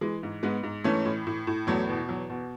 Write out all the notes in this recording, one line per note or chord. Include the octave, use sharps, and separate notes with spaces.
E3 G#3
G#2
G#2 G#3 B3
G#2
E3 A3 C#4
A2
A2
A2
E2 F#3 A3
B2
E2 F#3
B2